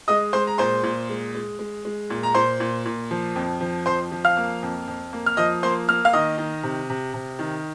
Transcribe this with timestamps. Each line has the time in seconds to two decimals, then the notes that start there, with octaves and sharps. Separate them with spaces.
0.08 G#3 D#5 D#6
0.33 G#3 C5 C6
0.47 A#5
0.58 A#2 C5 C6
0.83 A#2
1.09 G#3
1.35 G#3
1.59 G#3
1.85 G#3
2.10 A#2
2.23 A#5
2.34 A#2 C5 C6
2.60 A#2
2.85 A#2
3.11 F3
3.36 F2
3.61 F3
3.86 F2 C5 C6
4.12 F3
4.25 F5 F6
4.37 A#3
4.63 F2
4.88 F2
5.13 A#3
5.26 F6
5.37 F3 D#5 D#6
5.63 A#3 C5 C6
5.88 A#3 F6
6.05 F5 F6
6.13 D#3 D#5 D#6
6.38 D#3
6.63 C3
6.90 C3
7.14 C3
7.39 D#3